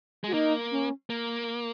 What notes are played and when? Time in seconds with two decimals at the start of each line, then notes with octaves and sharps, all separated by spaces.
0.24 G#3 F#4
0.33 A#3 D#4
0.71 C#4
1.10 A#3